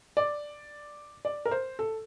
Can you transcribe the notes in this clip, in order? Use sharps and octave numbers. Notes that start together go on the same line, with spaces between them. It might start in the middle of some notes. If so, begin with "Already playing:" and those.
D5
D5
A#4
C5
A4